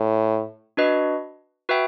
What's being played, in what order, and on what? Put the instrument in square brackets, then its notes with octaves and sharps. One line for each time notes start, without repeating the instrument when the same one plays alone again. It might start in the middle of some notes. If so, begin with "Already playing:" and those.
Already playing: [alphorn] A2
[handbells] D4 F#4 B4 D#5
F#4 B4 E5 G5